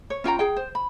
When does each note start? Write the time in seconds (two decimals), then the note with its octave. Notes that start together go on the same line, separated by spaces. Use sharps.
0.10 C#5
0.24 C#4 F4 G5 A#5
0.39 G#4 G5
0.56 C5
0.75 B5